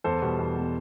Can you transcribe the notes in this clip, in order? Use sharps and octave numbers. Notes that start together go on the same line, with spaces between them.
E2 A4 C5
B2 G3
E2
B2 G3